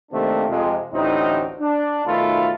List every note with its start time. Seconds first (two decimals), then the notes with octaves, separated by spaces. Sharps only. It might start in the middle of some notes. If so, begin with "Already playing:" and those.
0.11 C3 D#3 A3 A#3 C4 D4
0.49 F2 C3 G#3
0.92 A1 D2 A2 C4 D#4
1.60 D4
2.06 B1 D#3 A3 F4 A4 B4